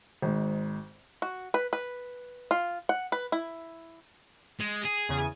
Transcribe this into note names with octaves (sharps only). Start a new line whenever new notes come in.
G#1 G#2
F#4
B4
B4
F4
F#5
B4
E4
G#3
G#4
E2 C#3 G#5